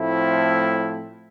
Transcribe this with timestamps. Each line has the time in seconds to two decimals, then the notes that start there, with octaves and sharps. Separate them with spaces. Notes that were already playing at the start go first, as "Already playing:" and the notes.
Already playing: A2 F3 A3 C4 E4